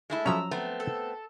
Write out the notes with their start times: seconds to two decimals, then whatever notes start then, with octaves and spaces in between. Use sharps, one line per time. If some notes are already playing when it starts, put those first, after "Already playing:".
0.10 G#3 A3 E4
0.26 F3 F#3 C#4 A#5 E6
0.51 A3 B3 C4
0.80 A4